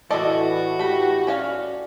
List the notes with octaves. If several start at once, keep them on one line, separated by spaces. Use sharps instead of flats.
A2 E3 E4 F#4 B4 D5 D#5 A5
A3 G4 B5
C#4 C#5 D5 F5